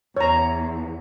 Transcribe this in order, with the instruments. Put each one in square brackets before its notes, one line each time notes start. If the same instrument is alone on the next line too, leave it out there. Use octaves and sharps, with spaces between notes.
[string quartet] E2 [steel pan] C#5 A#5